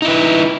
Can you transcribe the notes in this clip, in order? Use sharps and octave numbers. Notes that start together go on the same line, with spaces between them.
D#4 E4 B4